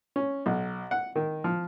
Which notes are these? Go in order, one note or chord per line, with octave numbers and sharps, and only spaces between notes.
C#4
B1
F#5
D#3
F3